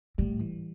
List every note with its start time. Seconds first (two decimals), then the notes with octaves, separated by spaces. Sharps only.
0.18 A2 G3
0.40 E3